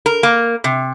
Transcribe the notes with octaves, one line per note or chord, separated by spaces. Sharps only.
A#4
A#3
C3